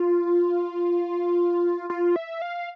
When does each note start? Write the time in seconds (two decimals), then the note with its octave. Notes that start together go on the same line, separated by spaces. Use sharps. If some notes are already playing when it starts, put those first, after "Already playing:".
Already playing: F4
1.90 F4
2.16 E5
2.42 F5